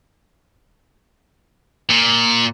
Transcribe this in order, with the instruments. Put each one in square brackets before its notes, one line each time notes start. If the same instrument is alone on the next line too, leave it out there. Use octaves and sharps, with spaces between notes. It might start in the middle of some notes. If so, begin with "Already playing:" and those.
[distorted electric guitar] A#2